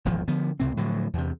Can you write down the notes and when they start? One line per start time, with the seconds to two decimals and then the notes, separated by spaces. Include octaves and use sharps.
0.05 D#1 G#1 E2 F3
0.28 D3 F3 B3
0.60 C#2 C3 C4
0.77 A2 D3 F3 F#3
1.13 E2 C3